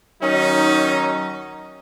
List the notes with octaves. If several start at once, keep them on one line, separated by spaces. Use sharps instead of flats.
D#3 F#3 C#4 D#4